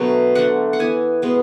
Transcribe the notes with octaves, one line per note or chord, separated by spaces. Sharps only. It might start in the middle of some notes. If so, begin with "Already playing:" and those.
Already playing: B2 D3 F#3 A3 B3
D3 A3 F#5
F#5
E3 B3 G#5
B2 G#3 B3